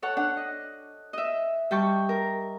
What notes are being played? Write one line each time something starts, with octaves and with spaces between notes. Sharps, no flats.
A4 C#5 F#5 A5
D4 F#5
D#5
D#5 E5
G3 G5 A5 C#6
A#4